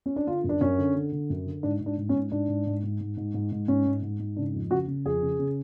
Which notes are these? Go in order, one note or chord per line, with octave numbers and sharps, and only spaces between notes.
C#4
D4
D3 F4
F#2
D4
F#2 C#4
D3
D3
D3
F#2
D3
G#2 D4
G#2
D4
G#2
C#4
G#2
G#2 D4
G#2
G#2
G#2
G#2
G#2
G#2
G#2
G#2 C#4
G#2
G#2
G#2
C#3 D4
F2
C#3 F#4
C#3
F2 G#4
C#3
C#3